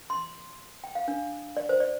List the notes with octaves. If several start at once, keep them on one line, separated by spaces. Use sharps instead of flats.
C6
G5
F5
D4
D5
C5
D5